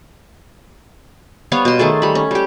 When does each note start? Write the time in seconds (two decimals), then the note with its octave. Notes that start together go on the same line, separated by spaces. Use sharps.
1.52 G3 B3 C#5 F5
1.65 B2 C6
1.79 D#3 A3 G#4 A4
2.02 G3 B5
2.15 C#4
2.31 G3 G4